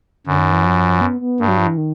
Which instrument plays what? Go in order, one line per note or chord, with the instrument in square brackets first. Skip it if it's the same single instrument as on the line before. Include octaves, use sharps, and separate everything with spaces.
[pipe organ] F#2 [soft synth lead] D3
[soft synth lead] D#3
E3
F3
B3
B3
[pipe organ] G2 [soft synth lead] A#3
[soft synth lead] F#3
F3
E3
D#3